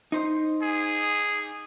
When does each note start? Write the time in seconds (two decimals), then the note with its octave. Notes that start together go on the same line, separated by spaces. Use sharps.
0.12 D#4 C5
0.62 G#4